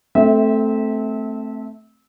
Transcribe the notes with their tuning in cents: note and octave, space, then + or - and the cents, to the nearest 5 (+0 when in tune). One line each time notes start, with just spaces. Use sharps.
A3 +0 C4 +0 E5 -25